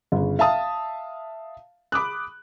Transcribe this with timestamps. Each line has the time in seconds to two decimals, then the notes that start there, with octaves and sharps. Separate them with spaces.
0.12 G1 C#3
0.39 E5 F5 A5 D#6
1.92 B5 D6 D#6 F#6